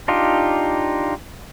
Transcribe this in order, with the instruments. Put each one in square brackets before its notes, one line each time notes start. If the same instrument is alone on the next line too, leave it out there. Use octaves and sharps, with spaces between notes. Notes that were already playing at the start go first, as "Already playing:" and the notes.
[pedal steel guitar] D4 D#4 F4 G4